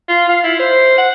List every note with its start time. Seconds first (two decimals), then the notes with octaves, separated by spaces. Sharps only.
0.09 F4
0.29 F5
0.43 E4
0.59 C5
0.98 F#5